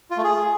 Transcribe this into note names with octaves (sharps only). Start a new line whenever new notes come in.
F4
A3
G#4